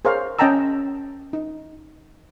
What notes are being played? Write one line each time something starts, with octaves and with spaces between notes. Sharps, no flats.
G#4 A#4 C5 C#5 F5
C#4 D#5 G5 A5 A#5 E6
D#4